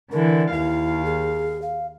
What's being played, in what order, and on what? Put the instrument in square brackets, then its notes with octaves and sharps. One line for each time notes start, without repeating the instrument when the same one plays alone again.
[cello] D3 E3 [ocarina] A#4
[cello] D#2 F5 [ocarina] E4
[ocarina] G#4
F5